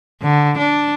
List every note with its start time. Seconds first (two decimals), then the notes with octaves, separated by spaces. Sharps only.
0.23 D3
0.58 D4